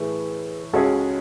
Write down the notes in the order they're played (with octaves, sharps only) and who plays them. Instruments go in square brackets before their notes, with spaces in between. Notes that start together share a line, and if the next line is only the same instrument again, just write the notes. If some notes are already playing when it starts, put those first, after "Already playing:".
Already playing: [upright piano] A2 E3 A3 E4 [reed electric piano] G#4 B4
[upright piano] C#2 C#3 G#3 C#4 G#4 [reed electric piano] F#4 A4